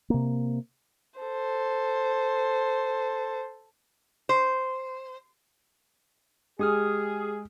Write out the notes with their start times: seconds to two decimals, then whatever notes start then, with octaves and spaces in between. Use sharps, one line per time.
0.10 C3 A#3
1.19 A4 C5
4.29 C5
6.59 G#3 G4 G#4 D#6 F6